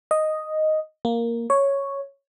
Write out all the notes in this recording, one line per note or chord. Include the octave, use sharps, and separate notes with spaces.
D#5
A#3
C#5